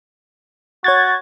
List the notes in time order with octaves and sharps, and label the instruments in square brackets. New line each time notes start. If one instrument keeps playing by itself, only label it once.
[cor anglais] F#4 [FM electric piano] C#5 G#6 A6